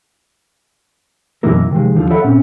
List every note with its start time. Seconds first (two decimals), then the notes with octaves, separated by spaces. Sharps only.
1.43 F#2 B2 E3 A#3 E4 A#4
1.71 C3 D#3 F3 G#3
1.96 D#2 D3 F3 F4
2.10 A4 C#5 D5 E5 F#5 B5
2.24 A#2 C4 C#4